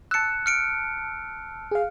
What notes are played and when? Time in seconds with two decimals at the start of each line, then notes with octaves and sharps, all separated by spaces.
0.11 A5 E6 F#6 C#7
0.46 F6 C#7 D7
1.71 G#4 F5